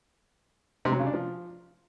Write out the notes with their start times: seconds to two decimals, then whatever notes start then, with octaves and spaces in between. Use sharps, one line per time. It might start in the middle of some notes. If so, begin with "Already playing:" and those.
0.85 C3
0.92 F#3
0.99 C#3
1.06 D4
1.14 F3